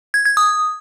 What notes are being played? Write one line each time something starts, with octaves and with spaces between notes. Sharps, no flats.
G#6
G#6
D#6